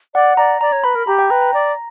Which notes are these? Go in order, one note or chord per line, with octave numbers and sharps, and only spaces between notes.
D5 F#5
D5 A#5
D5 A#5
C#5
B4 B5
A#4
G4 A#5
G5
B4 A#5
A#5
D5 A#5